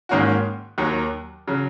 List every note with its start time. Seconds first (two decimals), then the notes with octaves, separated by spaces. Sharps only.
0.09 G#2 D#3 A#3 C#4 F#4
0.78 D#2 D#3 F#3
1.48 C#3 F#3